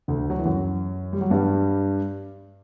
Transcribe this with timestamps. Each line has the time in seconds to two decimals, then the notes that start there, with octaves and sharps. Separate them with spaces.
0.08 D2 D3
0.30 F#3
0.38 E3
0.45 F#2 F#3
1.13 G3
1.21 F#3
1.30 G2 G3